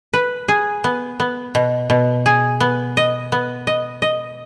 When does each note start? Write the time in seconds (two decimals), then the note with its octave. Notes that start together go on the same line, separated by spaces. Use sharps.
0.13 B4
0.48 G#4
0.84 B3
1.20 B3
1.55 B2
1.90 B2
2.26 G#4
2.60 B3
2.97 D#5
3.32 B3
3.67 D#5
4.02 D#5